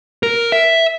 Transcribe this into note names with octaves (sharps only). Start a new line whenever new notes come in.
A#4
E5